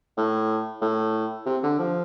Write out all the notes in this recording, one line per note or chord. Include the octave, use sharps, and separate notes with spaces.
A2
A2
C3
D3
F3